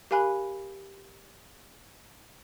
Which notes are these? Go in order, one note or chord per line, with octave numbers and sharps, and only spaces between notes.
G4 A#4 F5 G#5 B5 F#6